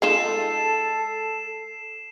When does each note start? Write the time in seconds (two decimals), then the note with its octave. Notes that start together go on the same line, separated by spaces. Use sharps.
0.02 G#3 D#4 F4 A4 C7 E7